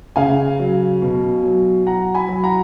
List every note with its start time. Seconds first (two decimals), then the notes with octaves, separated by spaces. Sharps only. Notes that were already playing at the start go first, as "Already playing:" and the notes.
0.16 C#3 F5 G#5
0.59 F#3
1.02 B2
1.43 F#3
1.86 F#3 F#5 A#5
2.15 G#5 B5
2.28 F#3
2.43 F#5 A#5